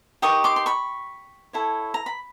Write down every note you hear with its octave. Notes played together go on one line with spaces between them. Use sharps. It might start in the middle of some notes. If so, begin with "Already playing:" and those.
D#4 G4 A#4 C#6 D#6
C6 D6
C6
B5 C#6
E4 A4 C#5
A#5
B5